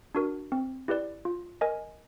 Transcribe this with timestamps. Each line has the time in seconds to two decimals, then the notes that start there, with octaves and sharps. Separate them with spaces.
0.15 D4 F#4 A#4
0.52 C4
0.88 E4 G4 B4 D5
1.25 F4
1.61 A#4 D#5 G#5